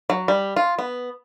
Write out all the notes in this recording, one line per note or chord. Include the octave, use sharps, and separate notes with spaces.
F#3
G3
F4
B3